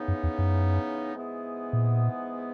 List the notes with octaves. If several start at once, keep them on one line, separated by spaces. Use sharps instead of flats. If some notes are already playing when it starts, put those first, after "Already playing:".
Already playing: C#3 E3 B3 D#4
F#2
E2
F#2
G#2 E3 B3 E4 G#4
A#2